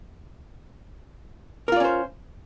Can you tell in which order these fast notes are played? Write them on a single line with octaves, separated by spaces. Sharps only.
A#4 F4 D5 C#4 C5